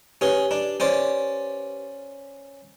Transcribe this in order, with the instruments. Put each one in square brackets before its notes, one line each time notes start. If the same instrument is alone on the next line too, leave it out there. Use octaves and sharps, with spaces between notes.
[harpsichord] C#4 G#4 [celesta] G4 B4 G7
[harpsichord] D4
C#4 C5 D5